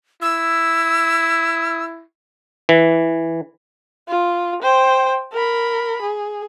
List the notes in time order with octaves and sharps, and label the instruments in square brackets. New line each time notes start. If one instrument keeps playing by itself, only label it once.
[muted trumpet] E4 [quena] E6
[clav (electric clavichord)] E3
[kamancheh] F4
C5 G5
A#4 B5
G#4